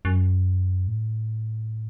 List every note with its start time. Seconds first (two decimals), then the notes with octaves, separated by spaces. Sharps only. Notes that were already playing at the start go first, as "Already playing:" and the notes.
0.05 F#2
0.88 A2